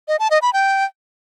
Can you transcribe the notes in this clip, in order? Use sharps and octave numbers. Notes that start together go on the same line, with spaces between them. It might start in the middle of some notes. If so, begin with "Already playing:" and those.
D#5
A5
D#5
B5
G5